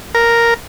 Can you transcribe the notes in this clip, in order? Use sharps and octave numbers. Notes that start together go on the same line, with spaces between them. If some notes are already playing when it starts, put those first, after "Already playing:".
A#4